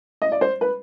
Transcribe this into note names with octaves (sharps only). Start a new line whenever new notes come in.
D#5
D5
C5
B4